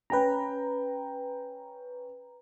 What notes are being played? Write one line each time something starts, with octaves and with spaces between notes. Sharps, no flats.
C#4 B4 G5 A#5